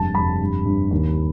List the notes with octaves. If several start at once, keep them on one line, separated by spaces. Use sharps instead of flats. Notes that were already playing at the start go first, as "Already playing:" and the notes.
Already playing: F1 G2 G#3 A5
F1 B5
G2
G2
D#2